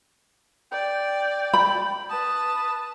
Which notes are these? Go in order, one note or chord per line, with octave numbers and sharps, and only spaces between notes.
D5 G5
B5
B4 A5 D#6